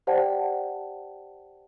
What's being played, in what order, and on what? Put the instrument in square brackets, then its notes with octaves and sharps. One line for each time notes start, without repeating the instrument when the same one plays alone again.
[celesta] G4 C5 D5 F#5 G5 A5